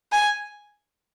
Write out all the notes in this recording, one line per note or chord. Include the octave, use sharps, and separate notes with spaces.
G#5